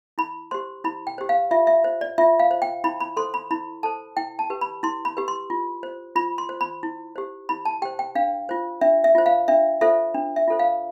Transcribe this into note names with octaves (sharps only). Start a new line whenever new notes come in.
E4 B5
G4 C5 C6
E4 B5
G5
G4 C5
F5
F4 E5
E5
C5
D5
F4 E5
F5
C5
G5
E4 B5
B5
A4 C5 C6
B5
E4 B5
A4 C5 A5
E4 G5
A5
G4 B4
B5
E4 C6
B5
G4 B4
C6
F4
C5
F4 B5
C6
C5
B5
E4
G4 C5
E4 B5
A5
G4 C5 G5
G5
D4 F5
F4 C5
D4 E5
E5
F4 C5
F5
D4 E5
F4 A4 C5 E5
D4
E5
F4 A4 C5
F5